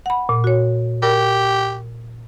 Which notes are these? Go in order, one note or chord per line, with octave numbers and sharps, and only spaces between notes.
F#5 B5
A#2
F#4 C#5
G4 A#4